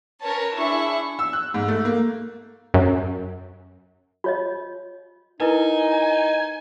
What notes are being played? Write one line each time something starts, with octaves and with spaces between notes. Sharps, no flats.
C#4 A#4 B4 C#5 A5
D4 E4 G#4 C#6
E6
F#6
G#2
A3
A#3
F#2
F4 C#5 D#5
D#4 E4 A#4 B4 G#5